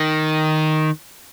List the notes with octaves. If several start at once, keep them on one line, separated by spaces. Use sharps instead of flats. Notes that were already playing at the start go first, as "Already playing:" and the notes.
Already playing: D#3